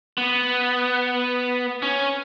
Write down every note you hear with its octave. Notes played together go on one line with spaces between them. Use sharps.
B3
C#4